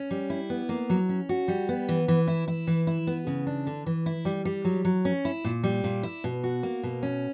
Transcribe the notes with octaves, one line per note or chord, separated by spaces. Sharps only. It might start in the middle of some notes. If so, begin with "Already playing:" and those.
Already playing: C#4
G3
E4
B3
A#3
F#3
C#4
F#4
G3
B3
E3
E3
E4
E4
E3
E4
B3
C#3
D4
D3
E3
E4
G3
G3
F#3
F#3
C#4
E4
A#2
G3
A#2
E4
B2
F#4
A#3
B2
C#4